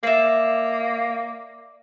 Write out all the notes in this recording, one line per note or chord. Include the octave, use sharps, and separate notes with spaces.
A#3 D5 E5